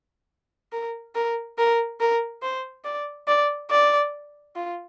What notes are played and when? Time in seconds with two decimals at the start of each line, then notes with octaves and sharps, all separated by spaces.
0.72 A#4
1.15 A#4
1.58 A#4
2.00 A#4
2.42 C5
2.85 D5
3.28 D5
3.70 D5
4.56 F4